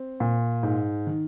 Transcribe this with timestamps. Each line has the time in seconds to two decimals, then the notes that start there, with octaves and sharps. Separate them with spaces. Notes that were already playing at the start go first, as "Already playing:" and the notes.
Already playing: C4
0.20 A#2
0.63 G#2
1.07 D#3